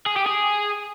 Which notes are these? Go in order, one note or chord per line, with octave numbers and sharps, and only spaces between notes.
G#4
G4
G#4